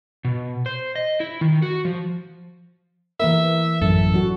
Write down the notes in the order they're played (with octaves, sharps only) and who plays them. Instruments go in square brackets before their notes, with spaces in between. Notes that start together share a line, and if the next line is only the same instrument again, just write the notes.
[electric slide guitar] B2
C5
D#5
E4
D#3
F#4
F3
[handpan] E3 A#3 A#4 [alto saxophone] E5
[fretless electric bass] A1 F#2 [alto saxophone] A4
[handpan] F#3 F#4